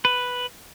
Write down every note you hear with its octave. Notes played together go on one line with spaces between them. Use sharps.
B4